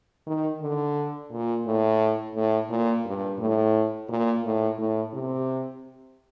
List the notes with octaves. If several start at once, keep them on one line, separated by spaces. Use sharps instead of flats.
D#3
D3
A#2
A2
A2
A#2
G2
A2
A#2
A2
A2
C3